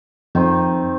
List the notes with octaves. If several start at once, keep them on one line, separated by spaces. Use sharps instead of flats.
F2 D#3 C4